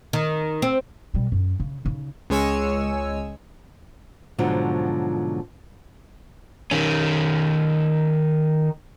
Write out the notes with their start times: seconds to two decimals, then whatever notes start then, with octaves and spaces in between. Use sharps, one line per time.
0.13 D#3
0.62 C4
1.15 B2 G3
1.32 F#2
1.60 C#3
1.85 C#3 D#4
2.30 C#2 G#3 C#5 G#5 E6
4.38 G#2 B2 D3 F3 F#3 F4
6.71 D#3 C#4